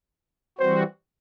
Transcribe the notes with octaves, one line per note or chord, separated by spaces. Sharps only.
E3 G3 C4 F#4 C5